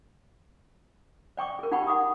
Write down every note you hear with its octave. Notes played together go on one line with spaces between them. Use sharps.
D5 G5 C#6 D6
G#4 A#4
D#4 G4 F#5 G5 B5 C#6
F#5 D6 D#6